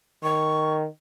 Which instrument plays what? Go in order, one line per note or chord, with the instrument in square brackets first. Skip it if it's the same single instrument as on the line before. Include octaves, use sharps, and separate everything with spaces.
[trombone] D#3 [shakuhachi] C#6